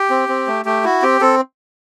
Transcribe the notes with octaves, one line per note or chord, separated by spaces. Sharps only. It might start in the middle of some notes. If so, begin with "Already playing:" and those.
Already playing: G4
C4
C4
A3
A3 G4
E4 F#4
C4 G4
C4 A4